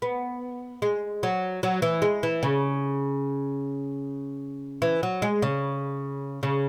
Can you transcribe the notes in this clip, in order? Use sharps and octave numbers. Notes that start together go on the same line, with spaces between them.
B3
G#3
F#3
F#3
E3
G#3
E3
C#3
E3
F#3
G#3
C#3
C#3